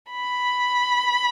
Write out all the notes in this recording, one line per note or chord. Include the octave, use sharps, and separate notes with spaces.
B5